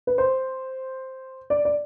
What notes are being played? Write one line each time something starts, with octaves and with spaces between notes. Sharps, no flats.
B4
C5
D5
D5